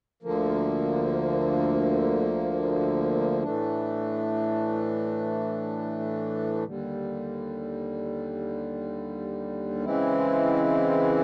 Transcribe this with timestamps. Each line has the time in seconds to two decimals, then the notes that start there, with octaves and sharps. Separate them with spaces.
0.23 D2 D3 F3 A#3
3.43 A2 E3 A3 D4
6.63 D#2 D3 G3
9.84 C#3 E3 G#3 C4 E4